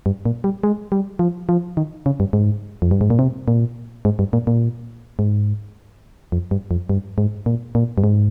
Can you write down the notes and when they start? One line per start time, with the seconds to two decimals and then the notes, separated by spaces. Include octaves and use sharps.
0.06 G2
0.25 A#2
0.44 G3
0.63 G#3
0.92 G3
1.19 F3
1.49 F3
1.77 D#3
2.06 C#3
2.20 G2
2.33 G#2
2.82 F2
2.91 G2
3.01 G#2
3.10 A#2
3.19 C3
3.48 A#2
4.05 G#2
4.19 G2
4.33 A#2
4.47 A#2
5.19 G#2
6.32 F2
6.51 G2
6.71 F2
6.90 G2
7.18 G#2
7.46 A#2
7.75 A#2
7.98 G2
8.04 G#2